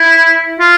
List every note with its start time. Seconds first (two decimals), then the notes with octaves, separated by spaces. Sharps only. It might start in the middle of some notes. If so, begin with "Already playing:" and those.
Already playing: E4
0.60 F4